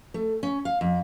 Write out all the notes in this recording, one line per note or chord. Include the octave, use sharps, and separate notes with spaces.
A3
C#4
F5
F2